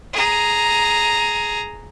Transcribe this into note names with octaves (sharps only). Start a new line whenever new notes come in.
G#4 A#5